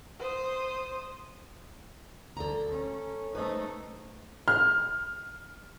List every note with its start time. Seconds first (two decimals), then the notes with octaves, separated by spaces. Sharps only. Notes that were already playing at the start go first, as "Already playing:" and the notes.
0.20 C5 D#6
2.37 D2 A4 A#5
2.72 C#4
3.35 A3 D#4 B4 C5
4.48 F6